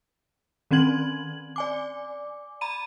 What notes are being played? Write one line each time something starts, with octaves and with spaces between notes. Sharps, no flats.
D#3 C4 C#4 G#6 F#7
D5 G#5 D6
A#5 B5 D#7